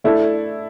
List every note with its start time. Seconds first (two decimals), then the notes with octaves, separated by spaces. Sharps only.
0.04 A3 D4 E4 A4